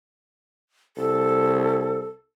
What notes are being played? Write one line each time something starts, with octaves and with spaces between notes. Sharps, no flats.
C2 A4